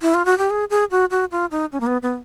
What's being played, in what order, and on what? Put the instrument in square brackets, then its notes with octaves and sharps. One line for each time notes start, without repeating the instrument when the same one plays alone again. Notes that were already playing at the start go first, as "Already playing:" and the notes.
[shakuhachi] E4
F4
F#4
G4
G#4
G#4
F#4
F#4
F4
D#4
C#4
A#3
B3
B3